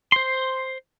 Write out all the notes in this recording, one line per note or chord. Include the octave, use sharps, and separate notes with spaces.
C5 C6